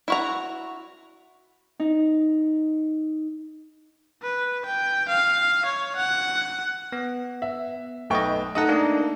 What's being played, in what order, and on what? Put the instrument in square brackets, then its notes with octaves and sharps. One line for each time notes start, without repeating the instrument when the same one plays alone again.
[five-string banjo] E4 F#4 A#5
[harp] D#4
[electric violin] B4
G5
F5
C#5
F#5
[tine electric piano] B3
[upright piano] E5
[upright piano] B1 G5 C#6 [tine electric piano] A3 B4 D#5
[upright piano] D#4 A4 D#6 [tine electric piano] D#5 F#5
[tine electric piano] A3 A#3 D4